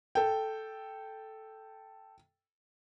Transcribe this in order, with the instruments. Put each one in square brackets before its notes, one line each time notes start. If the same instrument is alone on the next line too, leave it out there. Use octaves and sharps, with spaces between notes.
[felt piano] A4 G5